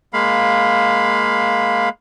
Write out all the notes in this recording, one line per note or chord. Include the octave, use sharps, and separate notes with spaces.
G#3 A#3 F5 B5